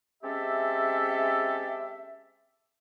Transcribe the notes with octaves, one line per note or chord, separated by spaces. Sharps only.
G#3 C4 C#4 G4 A4 E5